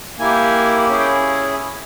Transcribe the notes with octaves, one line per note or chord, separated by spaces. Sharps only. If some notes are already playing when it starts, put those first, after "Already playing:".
A#3 E4 G4 G#5
C#4 E4 G#4
G5